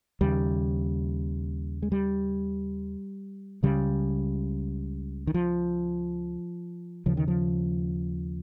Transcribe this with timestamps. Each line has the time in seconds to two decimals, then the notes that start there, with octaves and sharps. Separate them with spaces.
0.21 D#2 C#3 G3
1.82 G#3
1.92 G3
3.63 C#2 C#3 G3
5.27 D#3
5.34 F3
7.06 D#2 C#3 F3
7.17 D#3
7.28 F3